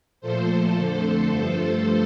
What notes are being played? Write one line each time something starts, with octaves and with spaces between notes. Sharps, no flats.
A#2 F3 A3 A4 C5
F2 D3 A3 A4 C5
G2 F3 A3 A4 C5